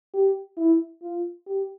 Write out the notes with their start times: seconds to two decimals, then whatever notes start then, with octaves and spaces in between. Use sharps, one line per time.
0.14 G4
0.57 E4
1.02 F4
1.46 G4